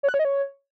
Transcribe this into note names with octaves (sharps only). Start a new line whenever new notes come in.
C#5
F#6
C#5
D#5
C#5